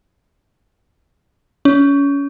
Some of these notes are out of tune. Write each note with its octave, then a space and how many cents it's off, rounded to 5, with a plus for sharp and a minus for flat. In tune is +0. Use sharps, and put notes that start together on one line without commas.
C#4 +25